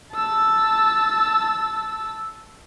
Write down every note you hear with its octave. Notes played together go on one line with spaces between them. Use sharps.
A5 E6